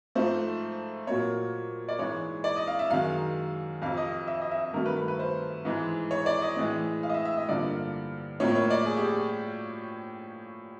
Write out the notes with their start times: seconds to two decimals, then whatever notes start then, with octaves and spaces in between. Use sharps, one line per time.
0.15 G#2 F3 A3 C5
1.07 A#2 F#3 A#3 C#5
1.89 D5
1.99 G#2 E3 G#3 C#5
2.44 D5
2.56 D#5
2.67 F5
2.79 E5
2.90 F#2 D#3 G#3 F5
3.82 F2 C3 F3 F5
3.97 D#5
4.13 D#5
4.28 E5
4.41 D#5
4.51 E5
4.73 G2 D#3 F#3 A3 A#4
4.86 B4
4.97 B4
5.08 B4
5.19 C5
5.65 G#2 E3 G#3
6.11 C#5
6.26 D5
6.42 D#5
6.57 A2 E3 G#3
7.03 F5
7.09 D#5
7.14 E5
7.25 E5
7.37 D#5
7.49 G2 D3 F3 A#3 D5
8.40 A2 F3 A#3 C#5
8.55 C#5
8.70 D5
8.86 G#4
8.97 G4